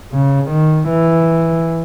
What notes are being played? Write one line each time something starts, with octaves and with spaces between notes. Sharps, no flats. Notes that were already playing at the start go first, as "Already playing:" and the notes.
C#3
D#3
E3